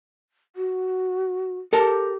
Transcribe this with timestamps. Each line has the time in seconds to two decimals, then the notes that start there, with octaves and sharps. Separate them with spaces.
0.56 F#4
1.73 G4 A4 A#4 A5